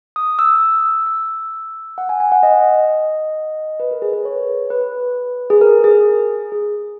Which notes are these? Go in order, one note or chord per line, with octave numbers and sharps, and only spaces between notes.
D#6
E6
E6
F#5
G#5
G#5
F#5
D#5
B4
A#4
G#4
B4
C#5
B4
G#4
A#4
G#4
G#4